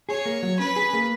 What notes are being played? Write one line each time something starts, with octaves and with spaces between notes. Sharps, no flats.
G#4 C#5
A#3
F#3
C#4 B4
G#4
A#3